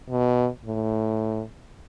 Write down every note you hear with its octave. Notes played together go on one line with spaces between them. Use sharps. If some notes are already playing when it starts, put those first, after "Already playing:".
B2
A2